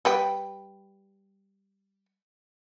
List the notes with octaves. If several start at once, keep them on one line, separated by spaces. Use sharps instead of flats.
G3 B4 G5